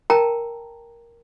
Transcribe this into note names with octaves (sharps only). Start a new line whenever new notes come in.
A#4 G5 A5 A#5